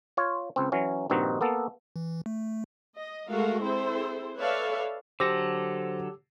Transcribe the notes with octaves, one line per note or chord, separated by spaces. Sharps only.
F4 C#5
C#2 C4
E3 F#3 C#4
A#1 G2 D#3 C4 D#4 F#4
A#3 B3 A4
E3
A3
D#5
G#3 A3 F#4 A4 A#4 F5
C4 E4 G#4 A4 C5
A4 B4 C#5 D5 E5 F5
D3 F#3 G4 A4 C5 D6 E6 A#6